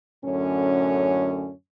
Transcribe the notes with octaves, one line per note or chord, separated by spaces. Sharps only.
F#2 A2 D3 C#4